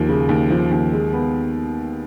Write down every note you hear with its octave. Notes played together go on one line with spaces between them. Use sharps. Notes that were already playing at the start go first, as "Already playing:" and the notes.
Already playing: D#2 F3
C#3
D#2
F3
D#2
G#3
B3